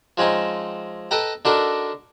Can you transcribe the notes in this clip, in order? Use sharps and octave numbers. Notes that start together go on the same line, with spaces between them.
F3 G#3 C4 C#4 D#4
A4 B4 D#5 G5 A#5
D3 D4 D#4 F#4 A4 A#4